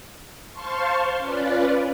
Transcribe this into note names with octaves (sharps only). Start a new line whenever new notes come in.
C5 F5 A5 C6 C#6
C#4 F4 B4 D5